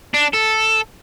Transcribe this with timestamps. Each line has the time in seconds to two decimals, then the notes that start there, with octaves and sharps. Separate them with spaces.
0.14 D4
0.33 A4